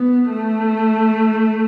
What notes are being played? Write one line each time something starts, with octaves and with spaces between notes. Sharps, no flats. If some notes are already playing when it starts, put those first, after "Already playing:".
Already playing: B3
A3